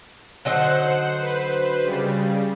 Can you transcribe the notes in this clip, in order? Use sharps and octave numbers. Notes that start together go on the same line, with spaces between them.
D3 F#3 D#4 C5 F#5
B4 C5
C#3 G3